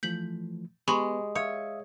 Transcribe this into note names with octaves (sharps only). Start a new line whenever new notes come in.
E3 F3 A3 G6 B6 F#7
G#3 B3 G4 B4 B5 C#6
C#5 E5 F5 D#6